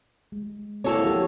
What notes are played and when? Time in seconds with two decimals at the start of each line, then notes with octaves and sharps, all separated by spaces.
0.32 G#3
0.84 A#3 C4 E4 F#4 A4 C#5
1.05 F3 G4